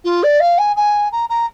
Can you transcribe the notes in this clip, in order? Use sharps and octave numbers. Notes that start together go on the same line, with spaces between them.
F4
D5
F5
G#5
G#5
A#5
A#5